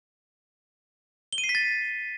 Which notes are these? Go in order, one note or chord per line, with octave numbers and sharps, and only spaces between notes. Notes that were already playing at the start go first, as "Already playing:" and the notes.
G7
D#7
C7
B6
A6